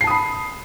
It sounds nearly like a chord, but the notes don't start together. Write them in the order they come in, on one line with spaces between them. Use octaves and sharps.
C7 A5 D#6 B5